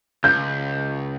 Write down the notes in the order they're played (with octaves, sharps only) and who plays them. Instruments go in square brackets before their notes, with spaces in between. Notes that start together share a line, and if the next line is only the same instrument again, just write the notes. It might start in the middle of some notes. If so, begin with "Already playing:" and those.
[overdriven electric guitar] C#2 [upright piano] G6